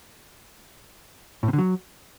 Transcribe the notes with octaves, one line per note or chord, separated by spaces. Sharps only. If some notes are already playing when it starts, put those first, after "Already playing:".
A2
C3
D3
F#3